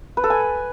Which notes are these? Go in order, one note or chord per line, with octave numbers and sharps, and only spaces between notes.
B4
A4
G#5